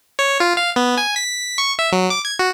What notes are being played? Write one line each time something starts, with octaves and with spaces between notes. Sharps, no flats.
C#5
F4
F5
B3
G#5
B6
C#6
E5
F#3
D6
G#6
F#4